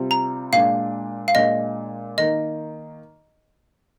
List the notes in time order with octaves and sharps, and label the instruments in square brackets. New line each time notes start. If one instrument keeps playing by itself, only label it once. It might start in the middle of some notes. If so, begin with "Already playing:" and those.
Already playing: [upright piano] C3 G3 C4 F4
[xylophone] A#5
[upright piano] A#2 G#3 D4 [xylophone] F5
[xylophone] F5
[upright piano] A#2 G#3 D4 [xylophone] D#5
[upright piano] D#3 A#3 [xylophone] D#5